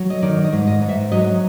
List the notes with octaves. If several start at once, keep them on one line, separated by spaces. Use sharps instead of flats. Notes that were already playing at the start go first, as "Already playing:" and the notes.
Already playing: F#3
D#5
D#3 D5
D#5
G#2
D#5
G#2
E5
F#3 D#5